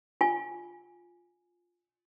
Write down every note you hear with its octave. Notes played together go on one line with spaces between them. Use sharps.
F4 G#5